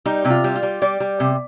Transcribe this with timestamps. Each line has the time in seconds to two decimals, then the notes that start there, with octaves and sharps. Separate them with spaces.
0.06 G3 D#4
0.25 C3
0.30 F4
0.44 G3
0.56 F4
0.63 G3
0.82 G3 D5
1.00 G3
1.20 C3